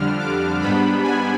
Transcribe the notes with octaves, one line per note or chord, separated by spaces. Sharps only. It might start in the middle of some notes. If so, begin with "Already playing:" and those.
Already playing: F2 D3 G3 D4 F6
D6
G#2 G3 B3 D4 B5
G#5